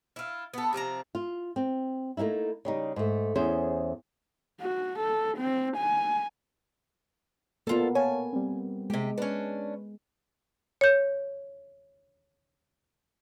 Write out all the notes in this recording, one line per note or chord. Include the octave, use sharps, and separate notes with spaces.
E4 F4
B3 A4
C3 F3 C4 A#5
F4
C4
A3 A#3 C#4 D#4 E4
C#3 G3 D#4
G#2 A3
E2 C#4 G#4 C5
F#4
A4
C4
G#5
D2 A#3 B3 F4 A4
C#5 F5 G#5 A5
G3 C4
C3 G#3 G4
C#4 D4 B4
C#5 G6